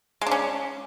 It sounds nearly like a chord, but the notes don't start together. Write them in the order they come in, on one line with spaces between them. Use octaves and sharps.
G#3 D4 C#4